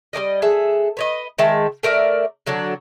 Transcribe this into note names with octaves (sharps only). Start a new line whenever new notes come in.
G3 A#3 D5 D#5
G#4 A4 E5
B4 C#5 D#5
D#3 G#3 E5 A5
A3 A#4 D5 E5
D3 F#3 D4 A4